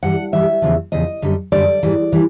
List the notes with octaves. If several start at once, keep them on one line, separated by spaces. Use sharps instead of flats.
G2 E3 G3 F#5
G2 E3 G3 E5
E2 C#3 F3
E2 C#3 F3 D#5
F#2 D3 G3
F#2 D3 G3 D5
G#2 E3 G3
E3 G3